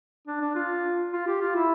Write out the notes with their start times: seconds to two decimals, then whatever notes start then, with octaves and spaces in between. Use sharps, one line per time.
0.27 D4
0.41 D4
0.55 F4
1.13 F4
1.27 G4
1.41 F4
1.56 E4